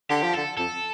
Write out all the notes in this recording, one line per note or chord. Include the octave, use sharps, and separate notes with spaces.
D3 G4
F3
D3 A4
F2 A4